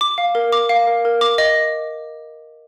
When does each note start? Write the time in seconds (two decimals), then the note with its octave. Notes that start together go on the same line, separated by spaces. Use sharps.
0.01 D6
0.18 F5
0.35 A#4
0.53 D6
0.69 F5
0.87 A#4
1.05 A#4
1.21 D6
1.38 D#5